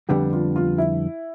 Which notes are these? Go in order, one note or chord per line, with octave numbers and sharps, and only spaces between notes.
F2 D3 G3 B3 D4 G4
F4
F4
E4